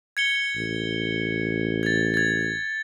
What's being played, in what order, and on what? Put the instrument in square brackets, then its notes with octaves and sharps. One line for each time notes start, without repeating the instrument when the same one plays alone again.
[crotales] G#6 C#7 G7
[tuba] A1
[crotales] G#6 A6
G#6 A6